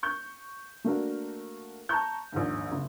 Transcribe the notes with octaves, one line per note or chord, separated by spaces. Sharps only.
C#6 G6
A3 A#3 D4 F#4 A#4
A5 A#5 C#6 G6
A#1 D#2 G#2
F#1